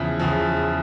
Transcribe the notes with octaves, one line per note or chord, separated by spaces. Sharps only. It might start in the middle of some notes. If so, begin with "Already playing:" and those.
Already playing: E2 C#3 F3 E5
E2 C#3 F3